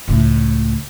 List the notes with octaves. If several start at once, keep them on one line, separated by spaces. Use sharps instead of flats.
C#2 A2